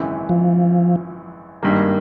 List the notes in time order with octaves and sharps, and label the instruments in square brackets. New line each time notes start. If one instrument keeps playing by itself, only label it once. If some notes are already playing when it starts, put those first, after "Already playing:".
Already playing: [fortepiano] G#1 F#2 C#3 E3
[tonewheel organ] F3
[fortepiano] G#1 G2 D#3 G3 A#3